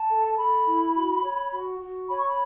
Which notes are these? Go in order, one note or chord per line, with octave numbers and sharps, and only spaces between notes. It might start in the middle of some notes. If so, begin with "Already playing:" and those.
Already playing: A5
A4
A4 B5
E4
F#4
C#5
F#4
F#4
C#5 B5
C#6
B5